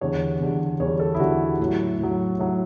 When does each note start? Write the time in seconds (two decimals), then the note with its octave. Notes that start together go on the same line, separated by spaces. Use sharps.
0.01 E2 D3 G3 C#5
0.40 E2 D3 G3
0.80 E2 D3 G3 C#5
1.00 A4
1.15 E4
1.20 E2 D3 G3 F#4
1.60 A2 F#3
1.99 A2 F#3
2.39 A2 F#3